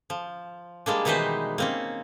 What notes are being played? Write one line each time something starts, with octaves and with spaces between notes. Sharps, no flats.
F3
G3 G#3 A#3 D4
B2 D#3 E3 D#4 B4 C5
A#3 C4 C#4